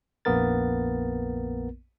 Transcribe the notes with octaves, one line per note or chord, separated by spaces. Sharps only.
A#1 F2 A#3 B3 A#4 A6